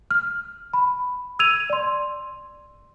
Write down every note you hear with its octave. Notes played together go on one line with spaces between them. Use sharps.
F6
B5
E6 G#6 D#7 F7
D5 C6